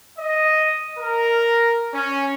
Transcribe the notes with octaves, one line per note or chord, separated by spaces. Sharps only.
D#5
A#4
C#4